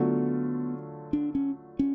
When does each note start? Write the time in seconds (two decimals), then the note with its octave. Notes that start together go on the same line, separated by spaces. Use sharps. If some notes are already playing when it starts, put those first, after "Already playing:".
Already playing: D3 F#3 A3 B3 F4
1.13 D4
1.35 C#4
1.79 C#4